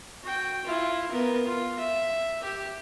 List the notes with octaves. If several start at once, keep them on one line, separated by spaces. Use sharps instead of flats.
F#4 G5
E4 F4
B3 A#4
F4
E5
G4